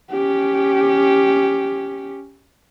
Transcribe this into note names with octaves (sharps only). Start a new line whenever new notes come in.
C#4 G4